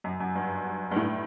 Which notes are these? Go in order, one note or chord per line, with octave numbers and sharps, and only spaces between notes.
F#2
F#2
G2
G2
A2